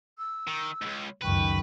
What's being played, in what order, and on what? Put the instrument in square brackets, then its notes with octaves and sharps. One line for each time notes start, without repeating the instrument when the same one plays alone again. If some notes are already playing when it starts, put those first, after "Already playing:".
[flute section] E6
[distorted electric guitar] D#3
C#2 G#2
[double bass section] C#2 F#2 D#3 [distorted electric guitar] B4 [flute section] G5 C#6